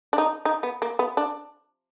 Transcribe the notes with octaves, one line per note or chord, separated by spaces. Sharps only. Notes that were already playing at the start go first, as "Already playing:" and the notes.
D4
D#4
D#4
B3
A#3
B3
D4